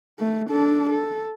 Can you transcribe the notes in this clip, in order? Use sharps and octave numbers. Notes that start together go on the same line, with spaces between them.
A3
D4 A4
A4